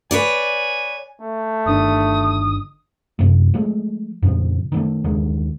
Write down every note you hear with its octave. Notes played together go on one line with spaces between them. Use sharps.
B4 C#5 D5 G#5
A3
G1 D3 D#3 D#6
F#2 C3 A3
F3 G#3 A3
F2 A#2 C#3 F3
D#3 F#3 A3
D#2 D3 D#3 G#3